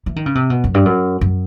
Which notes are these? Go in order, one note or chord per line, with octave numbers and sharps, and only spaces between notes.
E3
D#3
C#3
C3
B2
F#2
G2
F#2
F#2